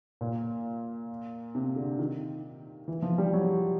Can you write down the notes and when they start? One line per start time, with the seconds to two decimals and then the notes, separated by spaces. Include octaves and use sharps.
0.21 A#2
1.55 C3
1.76 D3
1.99 D#3
2.88 E3
3.02 F3
3.18 G3
3.33 F#3